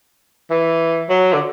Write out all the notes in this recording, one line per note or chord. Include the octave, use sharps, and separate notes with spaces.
E3
F#3
D3